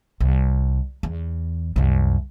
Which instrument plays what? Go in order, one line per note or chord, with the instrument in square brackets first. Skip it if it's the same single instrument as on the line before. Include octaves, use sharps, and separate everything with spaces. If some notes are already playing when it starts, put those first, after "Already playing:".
[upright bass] C2
E2
C2 F#2